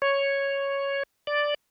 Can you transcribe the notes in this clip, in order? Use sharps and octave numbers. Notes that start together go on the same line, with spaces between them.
C#5
D5